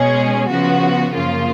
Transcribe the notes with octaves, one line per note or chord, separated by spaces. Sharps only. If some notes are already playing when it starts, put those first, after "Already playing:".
Already playing: B2 G#3 C#4 G#4
C#3 F3 B3 F#4
F#2 C#3 F3 A#3 F4